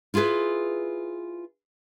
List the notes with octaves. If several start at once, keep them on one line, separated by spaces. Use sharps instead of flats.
E4 F4 G4 G#4 B4